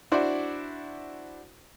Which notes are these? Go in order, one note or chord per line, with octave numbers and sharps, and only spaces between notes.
D4 E4 F#4 C5 D5